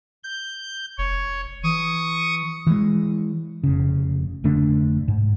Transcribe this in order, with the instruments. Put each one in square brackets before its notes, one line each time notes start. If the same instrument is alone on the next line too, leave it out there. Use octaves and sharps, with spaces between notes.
[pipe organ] G6
[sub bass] F1 [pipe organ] C#5
[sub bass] E3 [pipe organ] C#6 D#6
[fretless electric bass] E3 G#3
F1 C#3
F1 D3 A3 D4
G#2